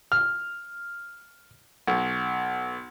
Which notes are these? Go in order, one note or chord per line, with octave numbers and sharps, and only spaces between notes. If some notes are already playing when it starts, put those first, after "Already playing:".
F6
B1